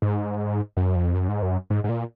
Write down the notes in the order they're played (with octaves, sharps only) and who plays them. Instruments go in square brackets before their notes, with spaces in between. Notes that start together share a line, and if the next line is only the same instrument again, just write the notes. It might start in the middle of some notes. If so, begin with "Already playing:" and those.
[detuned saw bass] G#2
F#2
F2
F#2
G#2
F#2
G#2
G#2
A#2